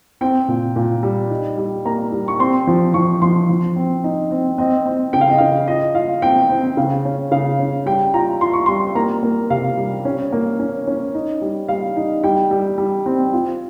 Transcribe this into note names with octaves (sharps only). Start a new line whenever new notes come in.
C4 G5
A#2
A#2
G3
D#4
G3
A#3 A#5
G3
C#6
C4 C6
F3
F3 C#6
F3 C6
F3
C4
D#4
C4
C4 D#5
C4
C#3 G5
F5
D#5
C#3 F5
F4 D#5
F4 F5
C4 G5
C4
C#3 F5
C#4
C#3 F5
C#4
G3 G5
F4 A#5
F4 C6
C#6
G3 C6
A#3 A#5
A#3
C3 F5
G3
C#4
A#3
C#4
C#4
D#4
G3
G3 F5
D#4
G3 G5
G3
G3
C4
F4